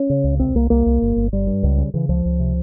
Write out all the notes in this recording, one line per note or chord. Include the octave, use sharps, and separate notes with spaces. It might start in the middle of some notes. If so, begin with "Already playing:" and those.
Already playing: C#4
C#3
C#2
C2 C4
C2 A#3
C2 A#3
C2
G1
G1
G1 G3
G2
C#2
C#3
C#3 E3
C#2 F3
C#2
C3